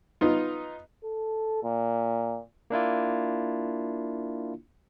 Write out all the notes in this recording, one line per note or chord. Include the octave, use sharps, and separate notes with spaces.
B3 D#4 F4
A4
A#2
A#3 D4 E4 F4